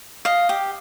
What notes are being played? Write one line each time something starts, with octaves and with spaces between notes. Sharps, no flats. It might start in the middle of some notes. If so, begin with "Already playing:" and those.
D#5 F5
G4